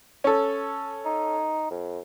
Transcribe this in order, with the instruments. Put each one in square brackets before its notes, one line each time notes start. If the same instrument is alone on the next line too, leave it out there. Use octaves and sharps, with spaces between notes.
[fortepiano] C#4 A4
[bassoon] D#4
F2